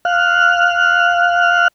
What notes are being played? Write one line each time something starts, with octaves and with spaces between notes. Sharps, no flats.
F5 F6 F#6